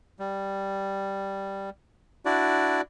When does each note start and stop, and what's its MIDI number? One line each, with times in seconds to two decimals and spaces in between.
0.19 1.70 55
2.25 2.81 62
2.25 2.81 64
2.25 2.81 66
2.25 2.81 74